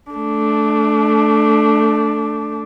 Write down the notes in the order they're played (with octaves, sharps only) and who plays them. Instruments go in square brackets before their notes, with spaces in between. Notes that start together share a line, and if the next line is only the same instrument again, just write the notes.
[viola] A3 D4